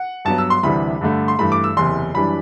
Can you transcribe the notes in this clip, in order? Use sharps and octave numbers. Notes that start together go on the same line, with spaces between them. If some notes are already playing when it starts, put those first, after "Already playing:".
Already playing: F#5
G2 F#3 B3 A5
E6
C6
D2 C3 E3 G3 D4 B5
G2 D3 A3
C6
G2 E3 A3 B5
D6
E6
F#1 E2 C3 C6
F#2 E3 G3 D4 B5